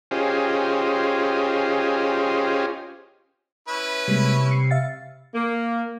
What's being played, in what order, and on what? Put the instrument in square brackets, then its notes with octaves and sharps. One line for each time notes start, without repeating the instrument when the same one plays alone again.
[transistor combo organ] C#4 F4 G4 G#4 C5 D#5
[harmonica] C#4 E4 B4
[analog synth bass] C3 [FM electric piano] G3 G#3 A#3
[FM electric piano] C7 C#7
E5 F5 A6
[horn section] A#3